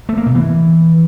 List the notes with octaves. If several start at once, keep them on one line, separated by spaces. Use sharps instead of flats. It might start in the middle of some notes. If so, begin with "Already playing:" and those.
A3
A#3
B2
E3